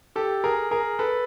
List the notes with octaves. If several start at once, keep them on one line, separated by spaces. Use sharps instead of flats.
G4 A4
G#4 A#4
G#4 A#4
A4 B4